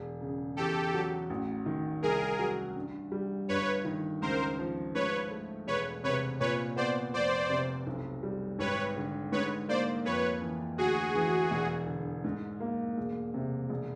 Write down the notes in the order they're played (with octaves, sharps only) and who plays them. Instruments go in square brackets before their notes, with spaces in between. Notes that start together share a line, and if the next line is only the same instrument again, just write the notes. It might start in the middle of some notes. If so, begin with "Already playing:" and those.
Already playing: [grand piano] E1
C#3
[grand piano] E2 [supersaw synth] G4 A4
[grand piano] F#3
A1
D#3
[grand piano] C2 [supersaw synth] G#4 A#4
[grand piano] F#3
G2
G3
[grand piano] G1 [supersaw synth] B4 C#5
[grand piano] D#3
[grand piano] C#2 [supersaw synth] A#4 C5
[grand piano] F3
[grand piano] G#2 [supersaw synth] B4 C#5
[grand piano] A3
[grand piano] E1 [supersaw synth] B4 C#5
[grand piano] C3 [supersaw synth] B4 C#5
[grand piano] A#2 [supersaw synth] B4 C#5
[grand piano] B3 [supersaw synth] C5 D5
[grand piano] F1 [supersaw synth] C5 D5
[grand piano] C3
B1
G3
[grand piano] G#1 [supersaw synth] B4 C#5
[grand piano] D3
[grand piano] G#2 [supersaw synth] B4 C#5
[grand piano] A#3 [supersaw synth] C5 D5
[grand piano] F2 [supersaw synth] B4 C#5
[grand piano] E3
[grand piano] D2 [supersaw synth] F#4 G#4
[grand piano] E3
E1
D3
G#2
A#3
E1
C3
E1